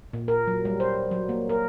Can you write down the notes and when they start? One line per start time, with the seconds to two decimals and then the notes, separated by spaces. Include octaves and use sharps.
0.13 A#2
0.28 A#4
0.47 F#3
0.65 G3
0.80 C5
1.11 F#3
1.29 A#3
1.49 A#4